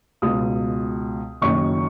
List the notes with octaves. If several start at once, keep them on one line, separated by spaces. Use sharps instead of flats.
C#2 B2 D#6
F#1 F#2 D#3 C#6